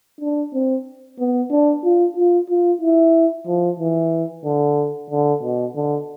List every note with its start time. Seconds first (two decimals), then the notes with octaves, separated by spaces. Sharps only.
0.21 D4
0.53 C4
1.19 B3
1.51 D4
1.84 F4
2.16 F4
2.50 F4
2.82 E4
3.47 F3
3.80 E3
4.45 D3
5.10 D3
5.43 B2
5.75 D3